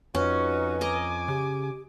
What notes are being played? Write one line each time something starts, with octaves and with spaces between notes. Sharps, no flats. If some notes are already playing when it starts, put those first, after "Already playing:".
F2 C#4 D#4 F#4 B4
D#5 G#5 A#5 D6
C#3 G4